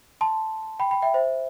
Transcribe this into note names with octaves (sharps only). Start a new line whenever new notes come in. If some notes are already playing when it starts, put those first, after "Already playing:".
A5 C6
G5 B5
G5 B5
E5 G5
C5 E5